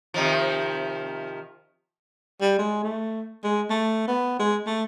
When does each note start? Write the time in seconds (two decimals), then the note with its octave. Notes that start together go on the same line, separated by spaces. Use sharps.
0.14 C3 D#3 F3
2.41 G3
2.58 G#3
2.83 A3
3.44 G#3
3.70 A3
4.08 B3
4.39 G#3
4.66 A3